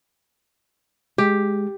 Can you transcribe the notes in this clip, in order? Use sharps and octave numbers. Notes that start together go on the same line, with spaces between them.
G#3 G4